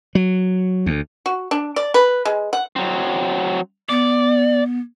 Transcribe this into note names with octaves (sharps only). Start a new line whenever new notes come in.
F#3
D2
F#4
D4
D5
B4
G#3
F#5
F#3 C4
B3 D5